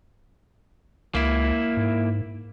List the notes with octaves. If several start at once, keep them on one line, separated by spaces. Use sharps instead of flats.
C#2 A#3 E4
G#2